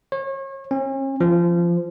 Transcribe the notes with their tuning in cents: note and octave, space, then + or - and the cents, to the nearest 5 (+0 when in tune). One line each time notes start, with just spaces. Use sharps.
C#5 -35
C#4 -40
F3 -20